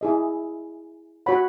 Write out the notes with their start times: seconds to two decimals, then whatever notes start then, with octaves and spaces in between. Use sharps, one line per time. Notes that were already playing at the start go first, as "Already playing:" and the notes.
0.01 E4 G#4 D#5
1.26 F#4 C#5 F#5 B5